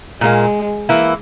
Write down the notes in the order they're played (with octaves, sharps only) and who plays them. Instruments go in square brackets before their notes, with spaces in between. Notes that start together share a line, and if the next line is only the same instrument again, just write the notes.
[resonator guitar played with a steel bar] A#2 G3 A#3 [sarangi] G#3
[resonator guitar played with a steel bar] E3 A#3 E4